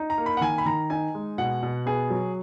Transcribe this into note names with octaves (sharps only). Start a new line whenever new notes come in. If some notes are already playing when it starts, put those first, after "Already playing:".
Already playing: D#4
A#5
A#3
B5
F#5
D#3 G#5
B5
D#3 A#5
D#4 G#5
G#3
B2 F#5
B2
B3 G#4
F#3